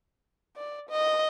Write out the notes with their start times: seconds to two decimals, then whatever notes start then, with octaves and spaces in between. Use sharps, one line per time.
0.56 D5
0.89 D#5